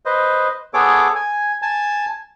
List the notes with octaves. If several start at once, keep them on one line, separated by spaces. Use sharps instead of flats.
B4 C5 D#5
B3 G#4 A4 C#5 D6
G#5
G#5 A5